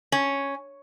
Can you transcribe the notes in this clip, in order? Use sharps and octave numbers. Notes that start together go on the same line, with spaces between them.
C#4